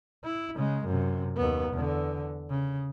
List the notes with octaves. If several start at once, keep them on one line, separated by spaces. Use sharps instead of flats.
E4
C#3 G#3
F#2 C3
D#2 B3
E2 D3
C#3